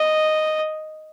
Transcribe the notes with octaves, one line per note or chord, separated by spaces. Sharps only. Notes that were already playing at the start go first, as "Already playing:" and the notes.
Already playing: D#5